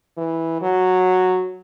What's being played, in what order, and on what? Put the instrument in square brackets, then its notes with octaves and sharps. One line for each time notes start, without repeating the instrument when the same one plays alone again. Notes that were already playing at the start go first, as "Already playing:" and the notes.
[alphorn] E3
F#3